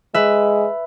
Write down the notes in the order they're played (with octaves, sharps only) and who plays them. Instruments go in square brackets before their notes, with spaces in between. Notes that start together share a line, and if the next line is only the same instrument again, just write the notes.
[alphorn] G#3 [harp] B4 E5